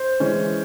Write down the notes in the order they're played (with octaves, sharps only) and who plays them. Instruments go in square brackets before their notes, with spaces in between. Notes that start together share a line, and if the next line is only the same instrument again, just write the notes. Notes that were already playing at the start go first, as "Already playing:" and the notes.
Already playing: [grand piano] C5
E3 G#3 C#4